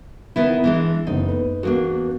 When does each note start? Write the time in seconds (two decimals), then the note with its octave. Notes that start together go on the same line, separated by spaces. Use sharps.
0.36 D#3 B3 E4
0.64 E3 G#3 D4
1.07 F#1 E2 D#4
1.28 B4
1.63 E2 A#3 B3 D4 F#4